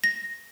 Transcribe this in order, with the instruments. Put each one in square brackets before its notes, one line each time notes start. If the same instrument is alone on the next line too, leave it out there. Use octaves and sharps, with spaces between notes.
[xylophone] A#6